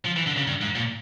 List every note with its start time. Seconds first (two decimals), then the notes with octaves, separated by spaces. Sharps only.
0.05 F3
0.16 E3
0.26 D3
0.37 C#3
0.47 G2
0.61 G#2
0.75 A#2